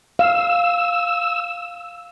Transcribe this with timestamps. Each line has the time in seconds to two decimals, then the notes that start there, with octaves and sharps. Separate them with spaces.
0.19 F5 E6